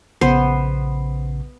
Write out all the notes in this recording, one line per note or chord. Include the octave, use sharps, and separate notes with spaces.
A#1 C#3 B3 C5 C7